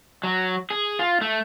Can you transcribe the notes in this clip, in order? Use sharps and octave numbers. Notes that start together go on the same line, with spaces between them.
F#3
G#4
F4
A3